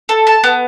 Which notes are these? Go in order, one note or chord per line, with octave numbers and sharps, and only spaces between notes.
A4
A5
B3